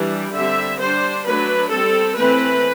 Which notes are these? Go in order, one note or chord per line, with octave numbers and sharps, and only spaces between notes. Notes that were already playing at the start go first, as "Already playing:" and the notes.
Already playing: E3 G3 D4
D3 G3 C4 E5
G3 D4 C5
F#3 A3 D4 B4
G3 C4 A4
E3 A3 C4 B4